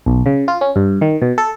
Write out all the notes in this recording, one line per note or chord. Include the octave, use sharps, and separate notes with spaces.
B1
C#3
F4
C#4
G2
D#3
B2
A4